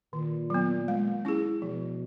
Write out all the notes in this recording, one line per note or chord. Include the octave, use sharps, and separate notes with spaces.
A#2 D#3
F#3 B3
G#3
C#4 E4 G#4
B2 F3